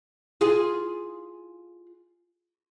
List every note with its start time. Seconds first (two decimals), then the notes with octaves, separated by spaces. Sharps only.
0.41 F4 G#4